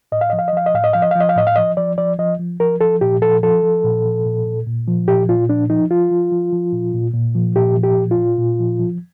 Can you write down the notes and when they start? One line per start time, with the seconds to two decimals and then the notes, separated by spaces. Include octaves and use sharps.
0.12 A2 D#5
0.21 F5
0.30 F3 D#5
0.39 F5
0.48 D#5
0.53 F3 F5
0.66 D#5
0.74 A2 F5
0.84 D#5
0.93 F3 F5
1.02 D#5
1.11 F3 F5
1.20 D#5
1.29 F5
1.36 A2 D#5
1.47 F5
1.56 F3 D#5
1.77 F3 D5
1.98 F3 D5
2.19 F3 D#5
2.39 F3
2.60 F3 A#4
2.81 F3 A4
3.01 A#2 G4
3.22 F3 A4
3.43 F3 A4
3.63 F3
3.84 A#2
4.05 F3
4.26 A#2
4.46 A#2
4.66 A#2
4.88 F3
5.08 A#2 G4
5.28 A#2 F4
5.49 F3 D4
5.70 F3 D#4
5.90 F3 F4
6.11 F3
6.32 F3
6.53 F3
6.73 A#2
6.94 A#2
7.14 A#2
7.35 F3
7.56 A#2 G4
7.76 F3
7.83 G4
7.97 A#2
8.11 F4
8.18 A#2
8.39 A#2
8.59 F3
8.80 F3